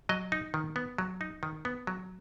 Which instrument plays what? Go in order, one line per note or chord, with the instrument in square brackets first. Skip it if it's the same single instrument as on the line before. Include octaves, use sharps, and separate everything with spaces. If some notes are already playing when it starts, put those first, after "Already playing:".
[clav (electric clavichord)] F#3 D#5
D#4
D#3
B3
F#3
D#4
D#3
B3
F#3